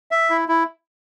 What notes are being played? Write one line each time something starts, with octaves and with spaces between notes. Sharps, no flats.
E5
E4
E4